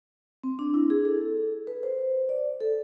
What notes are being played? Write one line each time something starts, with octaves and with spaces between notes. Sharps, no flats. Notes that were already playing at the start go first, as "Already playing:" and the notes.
C4
D4
E4
G#4
A4
B4
C5
C5
D5
A4